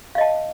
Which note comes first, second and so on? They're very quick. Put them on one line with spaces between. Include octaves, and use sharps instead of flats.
F5 D#5 A5